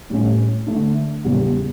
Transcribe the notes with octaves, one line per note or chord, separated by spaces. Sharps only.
A2 G3 C#4
D3 A3 D4
E2 C#3 G3